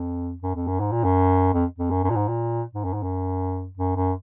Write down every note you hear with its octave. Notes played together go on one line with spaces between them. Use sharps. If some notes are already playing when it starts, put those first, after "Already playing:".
Already playing: F2
F#2
F2
F#2
G#2
A#2
F#2
F2
F2
F#2
F#2
A#2
G#2
A#2
G#2
F#2
G#2
F#2
F#2
F#2